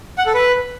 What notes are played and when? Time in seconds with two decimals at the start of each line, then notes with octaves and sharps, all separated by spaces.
0.18 F#5
0.26 A4
0.34 B4